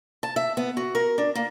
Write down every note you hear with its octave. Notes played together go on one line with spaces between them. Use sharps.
A5
E5
B3
F#4
A#4
D4
A#3